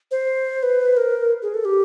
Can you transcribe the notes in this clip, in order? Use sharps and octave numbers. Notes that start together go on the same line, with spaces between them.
C5
B4
A#4
G#4
A4
G4